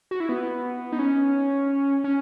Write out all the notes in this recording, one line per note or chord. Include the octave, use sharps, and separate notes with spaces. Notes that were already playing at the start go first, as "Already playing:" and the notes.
F#4
E4
B3
D#4
C#4
C#4